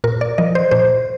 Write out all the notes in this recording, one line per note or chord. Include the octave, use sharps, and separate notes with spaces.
A#2 A#4
D5
F3 D#5
C5
A#2 C5